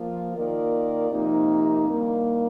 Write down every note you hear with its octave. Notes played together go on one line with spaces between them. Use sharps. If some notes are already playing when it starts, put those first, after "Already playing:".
Already playing: F3 A#3 F4
D#3 A#3 F4 A#4 D5
C3 F3 A#3 D#4
G2 D#3 A#3